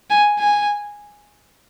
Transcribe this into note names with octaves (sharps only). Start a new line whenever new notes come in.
G#5
G#5